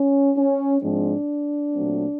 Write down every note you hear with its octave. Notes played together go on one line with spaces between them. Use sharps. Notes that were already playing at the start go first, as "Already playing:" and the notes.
Already playing: C#4
C#4
G#2 F3 G#3 C4 D4
A#2 F#3 A3 C4